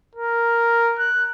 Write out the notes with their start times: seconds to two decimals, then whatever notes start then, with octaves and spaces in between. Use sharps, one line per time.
0.15 A#4
0.99 F#6